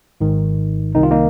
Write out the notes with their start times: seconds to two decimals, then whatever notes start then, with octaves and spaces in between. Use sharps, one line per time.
0.21 G#1 G#2 D#3
0.95 C2 C3 D#3 D#4
1.03 F4
1.11 A#3 D#4